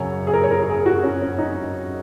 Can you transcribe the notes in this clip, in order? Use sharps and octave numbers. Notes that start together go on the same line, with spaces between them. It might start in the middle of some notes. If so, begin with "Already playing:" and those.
Already playing: F#2 C#3 F#3 C#5
G#4
A#4
C#5
A#4
G#4
F#4
C#4
C#4
D#4